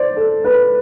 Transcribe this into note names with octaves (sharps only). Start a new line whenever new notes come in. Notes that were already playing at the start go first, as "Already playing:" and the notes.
Already playing: C5 D5
A4
B4